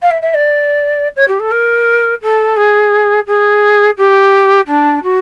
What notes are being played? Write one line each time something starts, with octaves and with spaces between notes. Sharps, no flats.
F5
E5
E5
D5
C#5
G4
A4
A#4
A4
G#4
G#4
G4
D4
F#4